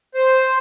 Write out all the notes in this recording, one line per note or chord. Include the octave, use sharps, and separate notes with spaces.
C5